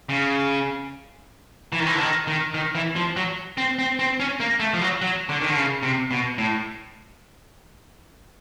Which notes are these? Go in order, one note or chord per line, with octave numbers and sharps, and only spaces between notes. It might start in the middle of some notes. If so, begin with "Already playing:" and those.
C#3
E3
D#3
E3
D3
D#3
D#3
D#3
E3
F3
F#3
C4
C4
C4
C#4
A#3
A3
F3
F#3
F#3
D3
D#3
D3
C#3
C3
B2
A2